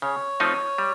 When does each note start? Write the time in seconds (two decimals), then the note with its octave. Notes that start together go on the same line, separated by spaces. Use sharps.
0.02 C#3 C#5
0.40 F3 A3 C4 D#4
0.78 G3